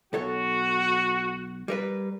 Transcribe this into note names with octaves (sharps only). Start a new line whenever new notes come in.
B1 F#4 A4 C#5
G3 A#4 B4